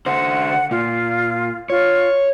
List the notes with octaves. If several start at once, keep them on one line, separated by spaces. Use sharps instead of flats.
D3 C5 F#5
A#2 F4
F4 C#5